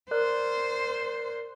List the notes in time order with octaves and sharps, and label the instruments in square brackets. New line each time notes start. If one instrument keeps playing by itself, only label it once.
[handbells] A#4 D5 F#6 [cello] C5